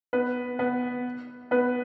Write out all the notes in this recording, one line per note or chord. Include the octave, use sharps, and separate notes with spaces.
B3 B4
B3 B4
B3 B4